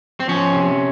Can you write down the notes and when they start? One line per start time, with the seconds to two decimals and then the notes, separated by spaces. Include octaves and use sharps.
0.20 C4
0.28 F3 C#4
0.53 C3